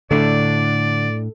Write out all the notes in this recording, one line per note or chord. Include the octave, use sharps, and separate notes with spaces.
A2 D3 A3 D4 A4 D5